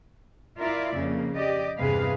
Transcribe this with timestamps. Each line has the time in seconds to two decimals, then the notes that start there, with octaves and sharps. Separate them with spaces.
0.59 E4 F4 A#4 D5 E5
0.95 F2 C#3 A#3
1.34 G4 D5 D#5
1.79 E2 G2 C3 G#4 B4 F5